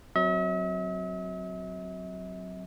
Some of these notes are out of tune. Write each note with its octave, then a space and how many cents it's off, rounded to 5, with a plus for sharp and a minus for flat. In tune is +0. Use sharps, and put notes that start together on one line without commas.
F#3 +0 C4 +0 E5 -45